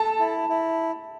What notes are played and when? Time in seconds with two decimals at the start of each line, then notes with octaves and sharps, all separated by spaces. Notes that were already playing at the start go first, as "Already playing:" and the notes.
Already playing: A4 A5
0.19 E4
0.49 E4